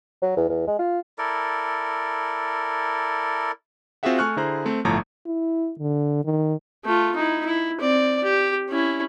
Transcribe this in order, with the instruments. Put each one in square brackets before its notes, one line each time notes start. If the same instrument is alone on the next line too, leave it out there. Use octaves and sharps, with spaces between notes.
[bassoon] F#3
E2
E2
G#3
F4
[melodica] E4 A4 A#4 D5
[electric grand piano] C4 F4 F#4 G#4 E5 F#5
A3 G#5 C#6 F6 F#6
D3 E4 G#4 C5 A#5 F#6
A3 C4
G1 A2 F3 A3 A5 A#5
[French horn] E4
D3
D#3
[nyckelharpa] A3 F4
D#4 E4
E4
C4 D5
G4
C#4 E4